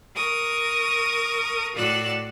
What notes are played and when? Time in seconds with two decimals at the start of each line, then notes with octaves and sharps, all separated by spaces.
0.15 A#4 C#6 D#6
1.74 A2 F#4 D5 E6 F#6